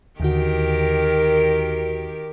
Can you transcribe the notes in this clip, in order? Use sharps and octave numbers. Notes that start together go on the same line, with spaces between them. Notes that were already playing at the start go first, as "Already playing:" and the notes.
D#2 D3 D#3 F#4 G4 A#4